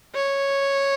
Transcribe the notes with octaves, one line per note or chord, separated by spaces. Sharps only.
C#5